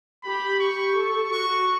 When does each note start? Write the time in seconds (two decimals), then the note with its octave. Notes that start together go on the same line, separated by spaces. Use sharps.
0.24 G4 B5
0.60 G4 C#6
0.96 A4 C#6
1.32 F#4 C#6